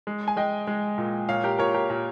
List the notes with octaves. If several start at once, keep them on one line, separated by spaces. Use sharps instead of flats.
G#3
G#5
G#3 D#5 G5
G#3
A#2
A#2 C#5 F5
G4 A#4
A#2 A#4 C#5
G4 A#4
A#2